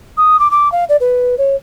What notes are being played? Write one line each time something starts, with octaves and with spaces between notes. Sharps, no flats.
D#6
D6
D6
F5
D5
B4
C#5